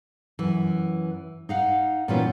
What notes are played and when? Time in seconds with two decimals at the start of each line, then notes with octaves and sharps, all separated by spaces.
0.39 F#2 E3
1.49 D#4 F5 F#5
2.08 A#2 E3 G3 B3 C#4 F4